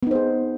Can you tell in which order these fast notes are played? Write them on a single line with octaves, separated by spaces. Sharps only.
B3 D#4 C5 G#4